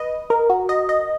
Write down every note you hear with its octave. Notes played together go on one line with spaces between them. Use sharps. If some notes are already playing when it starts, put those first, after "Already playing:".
Already playing: B4 D#5
A#4
F#4
D#5
D#5